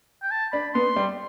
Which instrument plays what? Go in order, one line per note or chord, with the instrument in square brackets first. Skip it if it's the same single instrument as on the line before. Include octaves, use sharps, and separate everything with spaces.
[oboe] G5
A5
[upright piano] D4 [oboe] B5
[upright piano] B3 [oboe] C6
[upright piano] G3